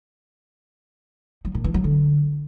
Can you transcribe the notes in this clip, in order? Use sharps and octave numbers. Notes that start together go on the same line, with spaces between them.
F#3
A#2
E3
F#3
D3